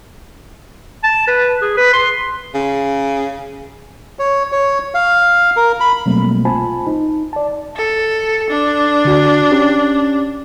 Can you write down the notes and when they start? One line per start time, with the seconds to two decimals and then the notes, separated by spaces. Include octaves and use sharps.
1.04 A5
1.28 B4
1.62 G#4
1.77 B4
1.93 C6
2.54 C#3
4.19 C#5
4.52 C#5
4.94 F5
5.57 A#4
5.80 B5
6.06 B2 F#3 G3 A3 A#3 C4
6.45 C2 F4 C5 G#5 A5 B5
6.87 D#4
7.33 D5 A5
7.77 A4
8.50 D4
9.05 D3 F#4
9.51 C#4 G4